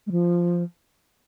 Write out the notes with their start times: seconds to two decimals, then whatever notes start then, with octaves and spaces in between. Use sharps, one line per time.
0.07 G#3
0.11 F3